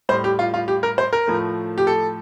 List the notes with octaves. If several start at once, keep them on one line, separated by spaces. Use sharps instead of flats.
A2 G3 C5
G4
F4
F4
G4
A#4
C5
A#4
A2 F3 A3
G4
A4